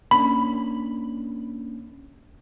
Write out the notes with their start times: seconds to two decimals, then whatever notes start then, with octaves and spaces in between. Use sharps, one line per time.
0.11 A#3 C#4 D4 B5